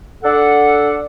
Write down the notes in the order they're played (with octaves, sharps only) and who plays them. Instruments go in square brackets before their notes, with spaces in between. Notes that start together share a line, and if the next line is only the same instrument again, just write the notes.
[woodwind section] D4 A4 F#5